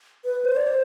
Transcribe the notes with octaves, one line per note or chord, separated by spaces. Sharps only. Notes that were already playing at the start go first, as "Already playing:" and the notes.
B4
C5
D5
C5